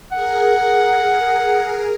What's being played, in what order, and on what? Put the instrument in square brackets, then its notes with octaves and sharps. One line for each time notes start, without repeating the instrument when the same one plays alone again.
[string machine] G#4 A#4 [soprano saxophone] F#5